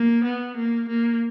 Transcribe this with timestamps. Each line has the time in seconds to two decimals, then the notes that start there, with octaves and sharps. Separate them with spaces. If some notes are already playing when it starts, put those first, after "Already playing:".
Already playing: A#3
0.25 B3
0.57 A#3
0.89 A#3